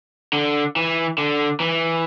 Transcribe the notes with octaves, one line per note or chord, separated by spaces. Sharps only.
D3
E3
D3
E3